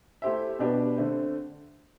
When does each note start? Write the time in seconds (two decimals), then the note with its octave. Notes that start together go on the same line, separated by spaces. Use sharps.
0.22 A3 E4 G4 C5 E5
0.59 B2 B3 D4 G4 B4
0.97 D3 A3 C4